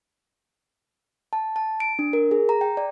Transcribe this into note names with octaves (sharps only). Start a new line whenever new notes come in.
A5
A5
D7
D4
A#4
G#4
A#5
G5
D5